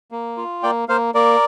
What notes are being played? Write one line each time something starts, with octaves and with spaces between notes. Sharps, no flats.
A#3
F4
A#3 D5 G5
A#3 C5 F5
A#3 A#4 D5